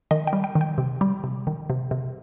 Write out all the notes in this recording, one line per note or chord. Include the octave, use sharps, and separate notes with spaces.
D#3 D#5
G5
G3
G5
D#3
G5
C3
G3
C3
D#3
C3
C3